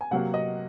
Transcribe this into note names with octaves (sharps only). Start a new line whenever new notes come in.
G#5
C3 F#3 A#3 F#5
D#5